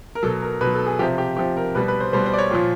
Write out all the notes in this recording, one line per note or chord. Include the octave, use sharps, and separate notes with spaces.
A#4
B2 F#3 A4
A#4
B2 B4
F#3
A4
G#4
C3 F3 G4
G4
C3 F3 G4
A#4
B2 G3 B4
B4
C5
B2 G3 C5
C5
D5
C#5
A#2 F3